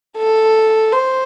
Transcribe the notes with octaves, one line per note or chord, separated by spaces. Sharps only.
A4
C5